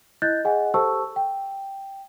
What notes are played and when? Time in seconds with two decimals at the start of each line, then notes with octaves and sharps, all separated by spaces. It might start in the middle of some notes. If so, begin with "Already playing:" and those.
0.22 E4 D#5 F#6 G6 A6
0.45 G#4 D#5 F#5 G#5
0.74 G4 A4 C5 A5 C#6 E6
1.16 G5